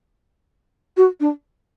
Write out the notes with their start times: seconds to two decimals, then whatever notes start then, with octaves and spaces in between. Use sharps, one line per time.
0.97 F#4
1.20 D4